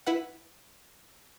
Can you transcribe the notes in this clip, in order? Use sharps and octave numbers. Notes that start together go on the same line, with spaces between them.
E4 B4 F#5